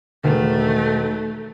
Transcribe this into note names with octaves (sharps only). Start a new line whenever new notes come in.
E1 D#3 G#3 A3